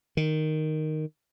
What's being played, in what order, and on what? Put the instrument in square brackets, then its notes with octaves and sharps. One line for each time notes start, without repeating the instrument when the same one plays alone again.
[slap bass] D#3